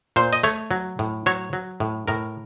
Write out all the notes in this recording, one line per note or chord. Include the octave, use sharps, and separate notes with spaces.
A#2 C5
D#5
A3 C#5
F#3
A2
F#3 C#5
F#3
A2
A2 A#4